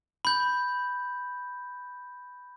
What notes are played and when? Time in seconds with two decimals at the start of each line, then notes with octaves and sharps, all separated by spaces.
0.25 B5 G6